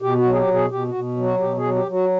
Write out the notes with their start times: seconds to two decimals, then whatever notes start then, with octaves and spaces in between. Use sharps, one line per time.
0.02 B2 G4
0.18 F#4
0.25 F#3
0.33 G#4
0.37 G4
0.49 B2
0.54 G#4
0.71 B2 G4
0.88 F#4
0.94 B2
1.17 F#3
1.23 F#4
1.40 B2 G4
1.57 G#4
1.64 F#3
1.75 G4
1.87 F#3
1.93 F#4